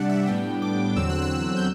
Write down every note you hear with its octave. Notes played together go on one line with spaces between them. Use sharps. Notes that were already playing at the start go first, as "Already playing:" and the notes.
Already playing: C3 G3 D4 D5 F#5
E5
A2 G3 B3 D4 G5
D6
E2 D3 F#3 C4 E6
F#6
E6
G6